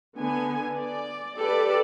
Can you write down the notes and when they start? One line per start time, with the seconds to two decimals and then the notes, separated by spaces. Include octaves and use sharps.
0.18 D3 B3 G#5
0.78 D5
1.38 G4 A4 B4 D5